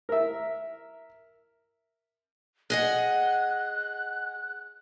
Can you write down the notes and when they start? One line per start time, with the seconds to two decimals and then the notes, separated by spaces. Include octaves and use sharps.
0.09 A#4 E5
2.70 G#4 D#5 F#5 F#6